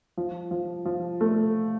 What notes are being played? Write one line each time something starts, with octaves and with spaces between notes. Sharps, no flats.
F3
F3
F3
A3